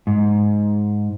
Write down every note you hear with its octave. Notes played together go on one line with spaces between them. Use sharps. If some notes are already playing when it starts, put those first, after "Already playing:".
G#2